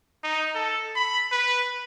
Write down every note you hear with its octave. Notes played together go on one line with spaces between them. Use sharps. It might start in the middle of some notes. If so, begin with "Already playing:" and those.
D#4
A4
B5
B4